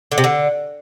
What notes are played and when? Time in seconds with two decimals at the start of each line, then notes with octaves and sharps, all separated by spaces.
0.12 D3
0.18 C3
0.24 D3